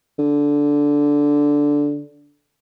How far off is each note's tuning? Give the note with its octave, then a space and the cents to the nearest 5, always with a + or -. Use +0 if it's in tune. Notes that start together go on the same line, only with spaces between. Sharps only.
D3 -10